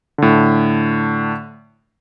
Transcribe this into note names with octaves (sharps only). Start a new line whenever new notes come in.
A2 D3